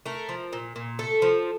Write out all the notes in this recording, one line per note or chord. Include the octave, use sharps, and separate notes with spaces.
A3 A#4
F3
A#2
A#2
A3 A4
F3